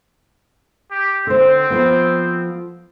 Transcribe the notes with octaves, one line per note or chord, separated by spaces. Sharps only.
G4
D3 C4 C5
F3 B3